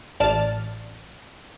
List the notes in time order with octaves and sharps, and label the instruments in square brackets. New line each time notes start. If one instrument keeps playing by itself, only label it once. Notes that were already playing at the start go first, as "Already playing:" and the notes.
[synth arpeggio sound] A1 D5 A5 F6 A6